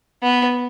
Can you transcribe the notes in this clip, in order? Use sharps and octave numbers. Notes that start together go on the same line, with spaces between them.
B3